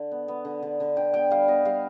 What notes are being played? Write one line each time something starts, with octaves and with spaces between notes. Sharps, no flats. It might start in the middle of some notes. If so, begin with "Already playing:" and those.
Already playing: D3
B3
B3
D3
D3
D3
D3 G5
B3 G5
G3 F5
B3 D#5
G3 F5